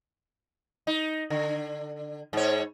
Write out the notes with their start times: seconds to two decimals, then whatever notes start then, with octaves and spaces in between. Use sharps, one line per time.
0.87 D#4
1.30 D3
2.33 G#2 C#5